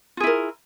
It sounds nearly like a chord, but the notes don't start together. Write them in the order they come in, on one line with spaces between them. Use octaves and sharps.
F4 G#4 E4 A#4